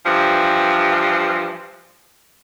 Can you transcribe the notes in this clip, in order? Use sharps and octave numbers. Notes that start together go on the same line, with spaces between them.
G2 E3 F3